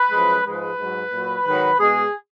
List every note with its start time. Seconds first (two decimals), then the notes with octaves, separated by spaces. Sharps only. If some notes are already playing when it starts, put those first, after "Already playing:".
Already playing: B4
0.11 F#2 F3 G#3
0.44 G#2 F3 G#3 B4
0.78 G#2 F#3
1.11 A#2 F#3
1.44 G#2 D#3 F#3 B4
1.77 B2 G#3 G#4